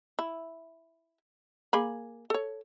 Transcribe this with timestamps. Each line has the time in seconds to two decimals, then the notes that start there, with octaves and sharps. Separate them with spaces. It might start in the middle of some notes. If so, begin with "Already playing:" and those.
0.19 E4
1.73 A#3 G#4 B5
2.30 A4 C#5